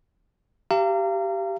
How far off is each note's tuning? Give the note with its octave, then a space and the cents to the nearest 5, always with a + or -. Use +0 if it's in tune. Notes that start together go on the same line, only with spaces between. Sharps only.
G4 -10 F5 -35 A#5 -30